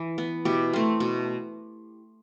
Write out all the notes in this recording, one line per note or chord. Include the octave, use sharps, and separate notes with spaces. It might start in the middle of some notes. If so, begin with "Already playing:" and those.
Already playing: E3
B3
B2 E4 G4
A3 C4
B2